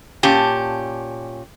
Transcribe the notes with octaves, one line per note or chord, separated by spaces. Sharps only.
A#2 C#4 G4 A5